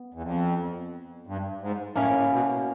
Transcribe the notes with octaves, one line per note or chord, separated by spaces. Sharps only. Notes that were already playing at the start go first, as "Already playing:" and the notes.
Already playing: B3
E2
F2
G2
G#2
A2 A#3 C#4 E4
B2